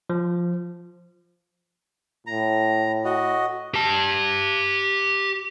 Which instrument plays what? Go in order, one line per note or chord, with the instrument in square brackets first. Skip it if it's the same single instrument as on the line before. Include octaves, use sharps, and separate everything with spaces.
[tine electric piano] F3
[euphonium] A2 [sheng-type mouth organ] A#5
[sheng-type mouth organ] F#4 D#5
[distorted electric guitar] G4 A5